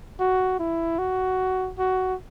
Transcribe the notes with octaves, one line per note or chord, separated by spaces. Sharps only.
F#4
E4
F#4
F#4